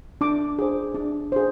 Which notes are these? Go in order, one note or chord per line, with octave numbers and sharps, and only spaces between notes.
D4 D6
G#4 C5
D4
G#4 C5